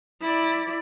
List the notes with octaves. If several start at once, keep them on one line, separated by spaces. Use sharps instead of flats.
E4 D5